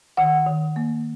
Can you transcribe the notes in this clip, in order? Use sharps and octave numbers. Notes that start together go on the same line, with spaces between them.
D#3 F#5
D#3
A#3